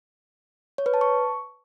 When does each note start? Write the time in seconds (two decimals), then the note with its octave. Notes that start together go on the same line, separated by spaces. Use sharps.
0.78 C#5
0.86 B4
0.94 A5
1.01 C#6